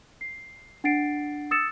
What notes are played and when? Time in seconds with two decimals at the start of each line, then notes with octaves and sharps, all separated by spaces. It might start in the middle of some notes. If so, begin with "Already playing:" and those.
0.21 C7
0.84 D4 F#5 A6 C7 D7
1.51 D#6 E6 A6 C#7 E7